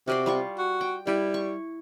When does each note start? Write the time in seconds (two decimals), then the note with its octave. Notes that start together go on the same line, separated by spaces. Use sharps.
0.08 C3 F#4 D5 C6
0.26 G3 F4 C#6
0.58 F#4
0.81 G5
1.07 G3 E4
1.34 C#6